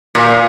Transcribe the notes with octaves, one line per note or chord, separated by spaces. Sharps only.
A#2